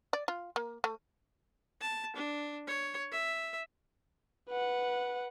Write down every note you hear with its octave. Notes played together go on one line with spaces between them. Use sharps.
D5
F4
A#3
A3
A5
D4
C#5
E5
B4 F#5